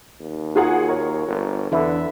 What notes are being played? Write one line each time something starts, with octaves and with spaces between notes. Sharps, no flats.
D#2
D#4 F4 F#4 G#4 F#5 A#5
A#4 C#5
G1
E2 D3 E4 B4 E5 B5